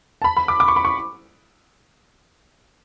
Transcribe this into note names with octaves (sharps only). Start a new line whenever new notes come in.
A5
B5
B5
D6
D6
C#6
B5
C#6